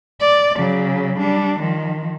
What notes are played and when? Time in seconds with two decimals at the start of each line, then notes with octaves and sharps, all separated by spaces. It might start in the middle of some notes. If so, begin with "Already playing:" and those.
0.20 D5
0.58 C#3 F#3
1.18 G3 D4
1.59 D#3 F3